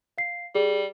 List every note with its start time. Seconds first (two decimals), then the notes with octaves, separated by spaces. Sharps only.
0.18 F5 C7
0.55 G3 G#4